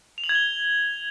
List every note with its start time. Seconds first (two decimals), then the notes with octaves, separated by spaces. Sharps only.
0.18 F7
0.24 F#7
0.29 G#6
0.35 G7